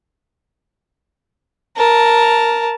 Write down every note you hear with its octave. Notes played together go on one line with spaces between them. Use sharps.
A#4 A5